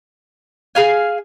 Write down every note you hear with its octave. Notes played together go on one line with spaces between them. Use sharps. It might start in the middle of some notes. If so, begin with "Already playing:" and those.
G#4 F5 G#5